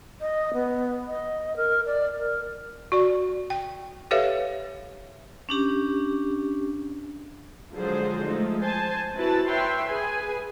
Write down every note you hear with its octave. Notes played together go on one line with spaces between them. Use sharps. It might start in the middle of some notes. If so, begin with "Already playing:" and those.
D#5
B3
D#5
A#4
D5
A#4
F#4 D5
G5
G4 A4 B4 C#5 E5 F5
C#4 D4 G4
D3 F3 F#3 G#3 G#4 C5
F3 G#3 A3 D#4
C5 G#5 A5
C4 E4 F#4 B4 A5
B4 C#5 E5 G5 C6
G#4 B4 G#5